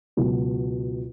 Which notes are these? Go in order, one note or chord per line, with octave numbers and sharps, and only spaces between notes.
C#2 B2 F#3